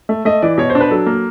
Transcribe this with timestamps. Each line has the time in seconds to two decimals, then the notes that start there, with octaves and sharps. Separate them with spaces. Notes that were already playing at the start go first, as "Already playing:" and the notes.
0.09 A3
0.25 A3 D#5
0.42 E3 D5
0.58 B2 C#5
0.70 C5
0.75 D4
0.81 B4
0.91 F#3 A4
1.06 A#3